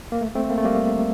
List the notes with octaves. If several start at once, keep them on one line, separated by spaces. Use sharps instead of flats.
A#3
A3
A3 C4
A#3
A3
G3 A#3